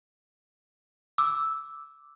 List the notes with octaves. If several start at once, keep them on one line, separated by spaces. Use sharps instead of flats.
D6 E6